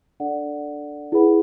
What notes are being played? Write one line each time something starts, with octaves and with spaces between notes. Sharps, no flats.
D4 A4 D5 F#5
E4 G#4 B4 F#5 B5